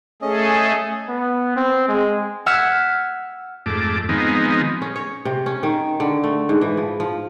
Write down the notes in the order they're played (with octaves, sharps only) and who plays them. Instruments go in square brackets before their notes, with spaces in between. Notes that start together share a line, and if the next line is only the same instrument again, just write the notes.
[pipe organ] A3 G#4 A4 [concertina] C#4 D#5
[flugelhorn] B3
C4
G#3
[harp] F#5 E6 F6 G#6 B6 E7
[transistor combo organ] F2 G#2 A3 D6
D#3 F3 G#3 B3 C4 D#4
[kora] C#4
C#5
C3
C#4
D#3
D3
A3
G#2
E3
F3
F3